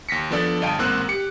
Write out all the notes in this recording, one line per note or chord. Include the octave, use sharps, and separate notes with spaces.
D#2 A#6 B6 C#7
F3 B3 D4 A4 D5
G1 D#5 F5 G5 A5 D7
A1 G#2 A#3 C4 E6 F#6
G4 C#7